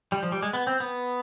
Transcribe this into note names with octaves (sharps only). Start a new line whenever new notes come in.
G3
F3
G3
G#3
B3
C4
B3